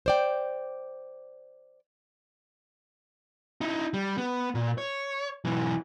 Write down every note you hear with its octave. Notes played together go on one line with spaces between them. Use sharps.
C5 D5 G5
D#4 E4
G3
B3
A#2
C#5
B1 E3